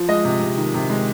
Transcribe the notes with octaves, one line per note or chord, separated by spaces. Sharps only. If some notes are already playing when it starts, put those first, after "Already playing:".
Already playing: F3
G#3 D#5
C3
C3
D#3
C3
G#3